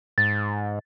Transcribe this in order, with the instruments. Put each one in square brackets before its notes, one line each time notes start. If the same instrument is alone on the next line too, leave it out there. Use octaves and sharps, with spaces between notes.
[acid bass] G#2 [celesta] A6